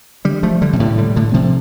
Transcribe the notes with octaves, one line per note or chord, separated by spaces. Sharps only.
D3 G3
F3 A3
D3 G3
C3
A2 D3
D3 G3
A2 D3
C3 F3